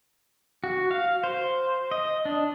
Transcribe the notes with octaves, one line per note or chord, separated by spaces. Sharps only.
F#4
F5
C5
D#5
D4